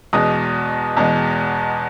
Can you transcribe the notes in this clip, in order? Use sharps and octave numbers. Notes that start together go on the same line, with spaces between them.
E2 B2 G#3 D#6
E2 B2 G#3